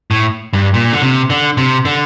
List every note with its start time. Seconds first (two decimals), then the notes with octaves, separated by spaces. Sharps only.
0.11 A2
0.53 G2
0.74 A#2
0.93 D3
1.02 C3
1.30 D3
1.57 C3
1.85 D3